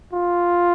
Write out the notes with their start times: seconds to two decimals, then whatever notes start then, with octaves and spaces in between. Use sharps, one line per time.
0.13 F4